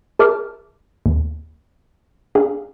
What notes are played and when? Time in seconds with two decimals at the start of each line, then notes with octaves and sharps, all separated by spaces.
0.19 G#4 A#4 E5 A5 D6 F6
1.06 D#2
2.35 D4 G#4 F5